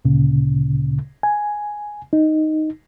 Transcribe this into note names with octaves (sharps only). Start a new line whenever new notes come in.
D2 A#2 C#3
G#5
D#4